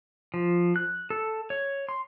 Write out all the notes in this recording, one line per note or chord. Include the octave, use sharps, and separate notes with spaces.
F3
F#6
A4
C#5
C6